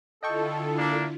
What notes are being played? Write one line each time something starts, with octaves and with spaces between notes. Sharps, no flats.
D3 E4 F4 A4 D#5 G5 C#6
A#3 D4